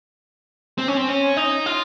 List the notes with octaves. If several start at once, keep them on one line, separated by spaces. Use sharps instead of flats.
C4
C#4
C4
C#4
D#4
F4